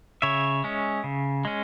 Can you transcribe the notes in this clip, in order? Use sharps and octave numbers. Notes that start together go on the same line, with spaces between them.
C#3 C#5 E5
G#3 C#4
C#3
G#3 C#4